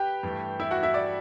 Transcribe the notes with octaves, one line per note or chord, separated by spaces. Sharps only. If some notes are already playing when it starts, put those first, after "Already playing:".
Already playing: G4 B4 G5
G2 E3 A3
E4 E5
F#4 F#5
E4 E5
D5